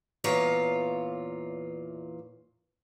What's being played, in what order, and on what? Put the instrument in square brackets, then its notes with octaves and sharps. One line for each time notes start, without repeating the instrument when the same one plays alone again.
[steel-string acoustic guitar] E2 A#2 E3 F4 C#5 A#5